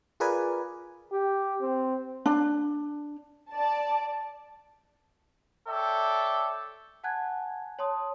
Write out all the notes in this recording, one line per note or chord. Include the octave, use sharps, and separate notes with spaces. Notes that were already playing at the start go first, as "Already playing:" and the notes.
F4 G#4 A#4 B4 D5 G#5
G4
C4
D4
D5 A5
A4 C#5 D5 E5 G5
F#5 G#5 A5 F#6 G#6
C#5 A5 C6 D#6